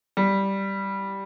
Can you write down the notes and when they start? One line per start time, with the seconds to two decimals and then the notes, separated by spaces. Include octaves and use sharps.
0.17 G3